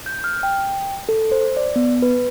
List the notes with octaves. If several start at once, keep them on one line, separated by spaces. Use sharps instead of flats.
G6
F6
G5
A4
C5
D5
B3
B4